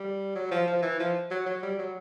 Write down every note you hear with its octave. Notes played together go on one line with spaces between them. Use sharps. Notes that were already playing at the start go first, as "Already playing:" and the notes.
Already playing: G3
F#3
F3
F3
E3
F3
F#3
F#3
G3
F#3